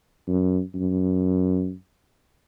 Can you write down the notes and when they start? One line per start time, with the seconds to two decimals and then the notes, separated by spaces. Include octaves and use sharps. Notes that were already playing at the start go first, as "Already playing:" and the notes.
0.28 F#2
0.75 F#2